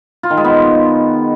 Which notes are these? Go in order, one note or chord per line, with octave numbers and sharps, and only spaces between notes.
F4
D#3
G#3
B3